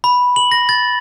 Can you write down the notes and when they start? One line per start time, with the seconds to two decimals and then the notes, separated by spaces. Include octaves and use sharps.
0.04 B5
0.36 F#7
0.52 A#6
0.69 A6